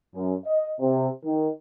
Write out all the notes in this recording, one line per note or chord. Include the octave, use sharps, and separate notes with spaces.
F#2
D#5
C3
D#3